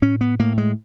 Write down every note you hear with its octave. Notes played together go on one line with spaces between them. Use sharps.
A2 C#4
B3
A2 A#3
G#3